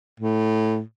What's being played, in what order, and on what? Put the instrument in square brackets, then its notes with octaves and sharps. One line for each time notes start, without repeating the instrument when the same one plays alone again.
[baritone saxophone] A2